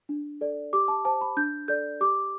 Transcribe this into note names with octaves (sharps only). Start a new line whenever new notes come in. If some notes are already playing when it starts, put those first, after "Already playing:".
D4
A4 D5
G4 D6
A5
C5 A5
B5
D4 G6
A4 D5 G6
G4 D6